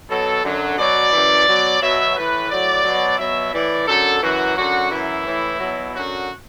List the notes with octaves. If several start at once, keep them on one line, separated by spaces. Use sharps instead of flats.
B2 F#3 A4
F#2 D3 F#3
B2 F#3 D5
F#2 E3
B2 F#3
B2 F#3 E5
A2 E3 B4
A2 F#3 D5
B2 F#3
B2 F#3 E5
A2 E3 D5
F#2 D3 F#3 A4
F#2 E3 F#4
F#2 D3 F#3 F#4
F#2 E3 E4
A2 E3
B2 F#3
F#2 D3 F#3 F#4